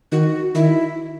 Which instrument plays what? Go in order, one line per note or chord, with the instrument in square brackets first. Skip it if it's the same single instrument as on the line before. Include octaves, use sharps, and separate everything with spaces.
[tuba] D#3 [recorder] F#4
[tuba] D#3 [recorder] E4